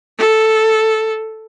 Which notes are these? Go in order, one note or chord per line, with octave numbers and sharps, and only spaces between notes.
A4